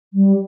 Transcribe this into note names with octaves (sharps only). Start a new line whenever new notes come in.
G3